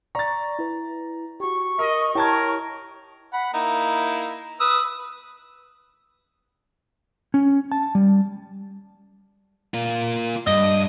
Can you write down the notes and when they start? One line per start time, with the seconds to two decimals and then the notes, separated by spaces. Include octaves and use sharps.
0.15 D5 A#5 C#6 A6
0.59 E4 B4
1.40 F#4 G4 C#6
1.79 A#4 D#5
2.15 E4 G4 A#4 C#5 G5 A5 G#6
3.33 F#5 B5
3.54 A#3 D#4 E4
4.60 B4 D#6 E6
7.34 C#4
7.72 A5
7.95 G3
9.74 A#3 F4
10.47 G2 D#5